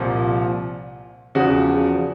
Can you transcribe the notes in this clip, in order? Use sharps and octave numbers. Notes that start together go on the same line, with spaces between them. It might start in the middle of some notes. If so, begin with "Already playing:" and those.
Already playing: C2 A#2 F3
E2 C#3 F3 F#4